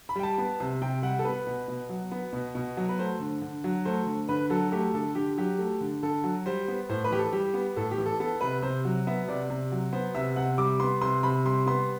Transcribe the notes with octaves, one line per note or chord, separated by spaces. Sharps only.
B5
G3 G5
A5
B3
C3
C3 G5
G3 F#5
A4
B3 B4
B2
B2
F#3
B3
B2
B2
F#3
B4
A3 C5
D3
D3
F#3
A3 C5
D3
D3 B4
F#3 A4
A3 G4
D3 A4
D3 G4
F#3 G4
A3
D3
D3 A4
F#3
G3 C5
B3
A2 C5
B4
E3 G4
A4
G3 G4
B3
A2 A4
G4
E3
A4
B3 A4
C3 B4
C3 C5
F#3
B3 E5
C3 D5
C3
F#3
B3 C5
C3 E5
C3 F#5
G3 D6
B3 C6
C3 C6
C3 B5
G3 C6
B3 C6